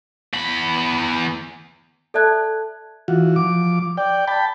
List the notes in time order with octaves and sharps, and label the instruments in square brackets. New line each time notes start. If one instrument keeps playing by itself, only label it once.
[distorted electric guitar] E2 B5
[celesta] A4 D5 E5 A5 F#6 G#6
[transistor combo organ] E3 F4 F#4
F3 D6
D5 G5
G5 A5 B5